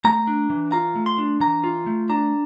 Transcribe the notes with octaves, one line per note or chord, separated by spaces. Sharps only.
A3 A#5
D4
E3
F4 A#5
A3
C6
D4
E3 A#5
F4
A3
D4 A#5